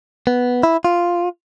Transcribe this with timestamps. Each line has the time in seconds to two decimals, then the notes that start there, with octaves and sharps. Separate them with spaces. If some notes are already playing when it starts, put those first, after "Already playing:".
0.27 B3
0.63 E4
0.85 F4